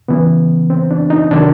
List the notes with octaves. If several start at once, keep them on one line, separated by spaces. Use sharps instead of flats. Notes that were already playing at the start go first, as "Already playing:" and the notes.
C#3 E3 B3
C4
D4
D#4
C3 D#3 F#3 D4